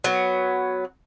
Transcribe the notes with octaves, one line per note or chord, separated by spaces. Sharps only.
F#3 B3